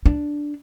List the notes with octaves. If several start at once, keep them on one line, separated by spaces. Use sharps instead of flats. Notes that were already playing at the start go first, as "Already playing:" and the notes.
D4